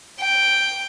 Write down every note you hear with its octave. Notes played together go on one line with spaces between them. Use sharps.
G5